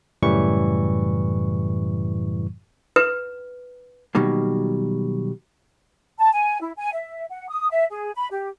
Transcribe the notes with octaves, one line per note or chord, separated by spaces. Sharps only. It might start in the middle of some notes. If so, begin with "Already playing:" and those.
F#2 A2 C#3 E3 G3 C#6
B4
B2 D#3 F#3 G3 A#3
A5
G#5
E4
G#5
E5
F#5
D#6
E5
G#4
B5
G4